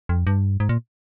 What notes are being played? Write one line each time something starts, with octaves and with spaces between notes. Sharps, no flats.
F2
G2
G#2
A#2